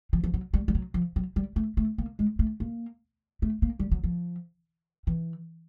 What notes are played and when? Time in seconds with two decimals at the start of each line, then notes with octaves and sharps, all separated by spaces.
0.13 F3
0.24 F3
0.34 F#3
0.53 G3
0.68 G3
0.75 F#3
0.94 F3
1.16 F#3
1.36 G3
1.56 A3
1.77 A3
1.98 A#3
2.19 G#3
2.39 A3
2.60 A#3
3.42 A3
3.62 A#3
3.79 G3
3.91 F#3
4.04 F3
5.07 E3